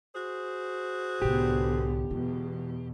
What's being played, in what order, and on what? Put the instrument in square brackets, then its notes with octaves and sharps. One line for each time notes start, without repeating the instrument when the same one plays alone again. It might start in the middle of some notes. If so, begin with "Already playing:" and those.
[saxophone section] F#4 G#4 C5
[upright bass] C2 A2 [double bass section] D3 B3 [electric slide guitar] G4
[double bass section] E2 B2 [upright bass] G#3 F4